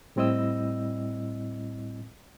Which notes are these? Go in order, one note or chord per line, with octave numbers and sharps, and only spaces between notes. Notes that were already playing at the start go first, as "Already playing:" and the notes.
A2 G3 C4 E4 D#5 E6